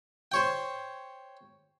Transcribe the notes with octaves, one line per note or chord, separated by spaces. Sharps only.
C5 C#5 G5